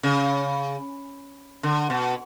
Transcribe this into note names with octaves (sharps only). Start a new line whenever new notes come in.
C#3
D3
B2